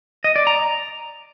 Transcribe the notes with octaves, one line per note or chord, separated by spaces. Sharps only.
D#5
D5
A#5